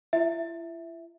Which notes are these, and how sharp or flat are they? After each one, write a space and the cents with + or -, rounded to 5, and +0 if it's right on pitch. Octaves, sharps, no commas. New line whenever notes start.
E4 +40 E5 +0